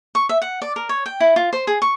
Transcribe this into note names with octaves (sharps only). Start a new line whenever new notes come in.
C#6
E5
F#5
D5
A#4
C#5
G5
E4
F4
C5
G#4
C#6